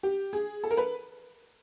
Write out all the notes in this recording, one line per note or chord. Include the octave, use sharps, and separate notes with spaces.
G4
G#4
A4
A#4
B4